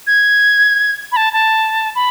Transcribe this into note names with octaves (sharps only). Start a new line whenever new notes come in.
G#6
B5
A5
A5
B5